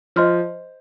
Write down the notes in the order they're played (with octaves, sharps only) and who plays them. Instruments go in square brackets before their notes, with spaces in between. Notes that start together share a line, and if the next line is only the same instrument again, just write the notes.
[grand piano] F3 [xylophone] C5 D#5 C6 F6